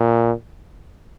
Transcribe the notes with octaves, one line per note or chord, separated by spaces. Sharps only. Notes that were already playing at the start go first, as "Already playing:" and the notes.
Already playing: A#2